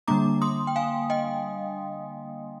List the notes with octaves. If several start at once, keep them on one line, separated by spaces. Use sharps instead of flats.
D3 G3 A#3 D4 A#5 D6
C6 D#6
G5
F5 G#5
D#5 G5